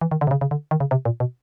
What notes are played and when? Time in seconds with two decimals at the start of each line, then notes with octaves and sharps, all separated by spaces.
0.01 E3
0.11 D#3
0.21 D3
0.27 C3
0.31 C#3
0.41 C#3
0.51 D3
0.71 D#3
0.80 C#3
0.91 C3
1.05 A#2
1.20 B2